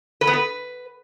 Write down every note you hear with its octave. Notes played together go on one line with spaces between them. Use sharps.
B4
B3
B4